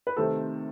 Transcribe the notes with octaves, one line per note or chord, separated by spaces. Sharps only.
B4
C3 D#3 A3 C4 A4